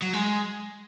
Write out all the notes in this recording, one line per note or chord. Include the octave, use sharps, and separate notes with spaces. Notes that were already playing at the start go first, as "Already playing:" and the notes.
F#3
G#3